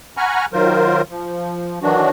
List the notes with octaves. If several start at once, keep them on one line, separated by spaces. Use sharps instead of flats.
F#5 G#5 A#5 B5 C#6 F6
D#3 F#3 F4 A#4 C5
F3
D#3 E3 F#3 D4 F#4